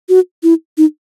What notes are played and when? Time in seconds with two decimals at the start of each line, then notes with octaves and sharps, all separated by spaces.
0.09 F#4
0.43 E4
0.78 D#4